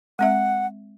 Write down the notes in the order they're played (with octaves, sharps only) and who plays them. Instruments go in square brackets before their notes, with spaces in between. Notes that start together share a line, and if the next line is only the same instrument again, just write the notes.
[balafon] G#3 C4 E5 [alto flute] F#5